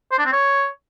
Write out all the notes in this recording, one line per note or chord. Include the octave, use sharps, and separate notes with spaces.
C5
D4
C4
C#5